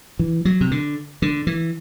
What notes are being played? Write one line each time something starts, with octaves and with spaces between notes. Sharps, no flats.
E3
F#3
C3
D3
D3
E3